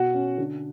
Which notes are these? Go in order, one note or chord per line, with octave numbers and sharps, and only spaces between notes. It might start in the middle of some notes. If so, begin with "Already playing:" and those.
Already playing: B2 F#4 F#5
C#4
D3